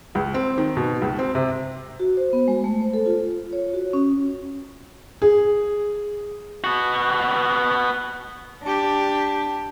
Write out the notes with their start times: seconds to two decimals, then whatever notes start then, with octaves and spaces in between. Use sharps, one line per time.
0.15 C#2
0.34 C4
0.58 D#3
0.77 B2
1.02 C#2
1.19 C4
1.35 C3
2.00 F#4
2.17 C5
2.33 B3
2.48 G#3
2.64 A3
2.81 C5
2.94 A4
3.06 F4
3.53 C#5
3.74 F#4
3.93 C#4
5.22 G#4
6.64 B3 F#4
8.64 D4 G4